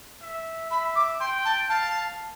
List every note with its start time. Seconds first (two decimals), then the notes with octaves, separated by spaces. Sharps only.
0.22 E5
0.71 E5 B5
0.96 D6
1.20 G5 C6
1.45 A5
1.70 F5 A5